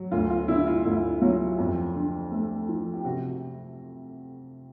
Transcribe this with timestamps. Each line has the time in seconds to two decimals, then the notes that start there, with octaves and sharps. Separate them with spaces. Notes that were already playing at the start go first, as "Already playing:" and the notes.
Already playing: F#3
0.11 D2 F4
0.30 F4
0.48 D3 E4
0.67 F4
0.85 D2 E4
1.21 F#3 F4
1.58 F2
1.96 D3
2.31 A3
2.69 F3
2.94 G4
3.05 C3 F#4